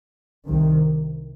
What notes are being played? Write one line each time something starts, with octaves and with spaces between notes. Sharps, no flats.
C2 C3 D#3